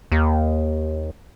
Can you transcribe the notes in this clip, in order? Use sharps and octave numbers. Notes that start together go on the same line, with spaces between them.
D#2